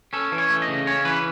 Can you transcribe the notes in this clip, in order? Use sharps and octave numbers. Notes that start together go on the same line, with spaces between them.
C#4 A4
E3
C#5
A3
D#5
C#3
C#4 C#5
E3 B4